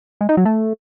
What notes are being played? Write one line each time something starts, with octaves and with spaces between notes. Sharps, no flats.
G#3
D#4
F#3
A3